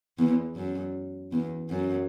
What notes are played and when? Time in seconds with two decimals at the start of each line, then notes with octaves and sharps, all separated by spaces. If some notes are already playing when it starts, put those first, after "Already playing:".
0.19 E2
0.56 F#2
1.32 E2
1.70 F#2